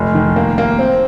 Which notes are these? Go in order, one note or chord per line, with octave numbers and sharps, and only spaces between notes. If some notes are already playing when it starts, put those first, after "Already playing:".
Already playing: F1
D#3
A#3
A#3
C4